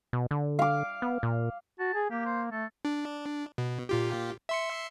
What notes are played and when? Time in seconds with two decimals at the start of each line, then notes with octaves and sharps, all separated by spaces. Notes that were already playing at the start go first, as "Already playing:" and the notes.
0.13 B2
0.31 D3
0.59 F5 D6
1.02 B3
1.23 A#2
1.79 F#4 A5
1.94 G#4
2.10 A#3 G4
2.25 C5
2.51 A3 A4
2.85 D4
3.58 B2
3.89 A#2 F4 G4
4.49 E5 C6 C#7